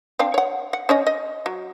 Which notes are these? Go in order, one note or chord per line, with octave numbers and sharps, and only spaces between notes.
C4 D4 F5
C#5 F#5
F#5
C#4 C#5 D#5
D#5
F#3